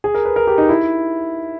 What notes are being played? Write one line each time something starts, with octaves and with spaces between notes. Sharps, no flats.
G#4
A#4
B4
A#4
G4
D#4
E4